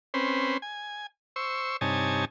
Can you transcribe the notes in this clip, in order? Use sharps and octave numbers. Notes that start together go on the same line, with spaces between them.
C4 C#4 B4 C5
G#5
C5 C#6 E6
G2 C3 D#4 C#5 G#5 A5